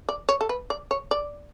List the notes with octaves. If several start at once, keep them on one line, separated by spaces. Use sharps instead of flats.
D5
C#5
A4
B4
D5
C#5
D5